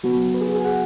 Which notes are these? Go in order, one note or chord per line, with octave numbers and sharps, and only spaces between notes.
C#3 F#3 B3 F#4
B4
G#4
F#4
G#4
G#5
F#5